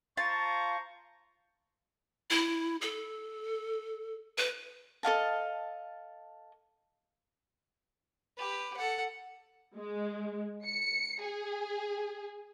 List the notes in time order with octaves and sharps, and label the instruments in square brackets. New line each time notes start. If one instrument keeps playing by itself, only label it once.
[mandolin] F4 A5 [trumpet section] C5 A#5 C#6
[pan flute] E4
A4
B4
[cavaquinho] A4 D#5 F5 A5
[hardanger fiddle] G4 B4
A4 F#5
[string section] G#3
C#7
G#4